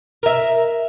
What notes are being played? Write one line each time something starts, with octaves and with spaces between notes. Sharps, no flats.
A#4 E5